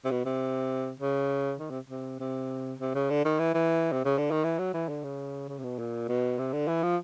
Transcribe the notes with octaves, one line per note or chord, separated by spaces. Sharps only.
C3
B2
C3
C#3
D#3
C3
C3
C3
C3
C#3
D3
D#3
E3
E3
C3
C#3
D3
D#3
E3
F#3
E3
D3
C#3
C#3
C3
B2
A#2
B2
C3
D3
E3
F3